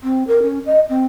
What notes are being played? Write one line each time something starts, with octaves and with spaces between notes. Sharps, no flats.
C4
A#4
C#4
D#5
C4